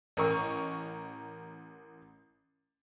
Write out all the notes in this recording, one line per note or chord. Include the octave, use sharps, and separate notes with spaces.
A1 A#4 C#6